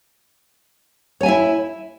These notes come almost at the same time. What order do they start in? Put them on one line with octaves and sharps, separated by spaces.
C#5 G#5 E5 E4